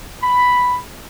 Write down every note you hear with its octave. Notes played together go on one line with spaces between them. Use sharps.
B5